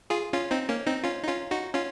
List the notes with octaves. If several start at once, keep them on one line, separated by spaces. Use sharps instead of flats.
F4 G#4
C#4 F4
C4 D#4
A#3 C#4
C4 D#4
C#4 F4
D#4
C#4 F4
D#4 F#4
C#4 F4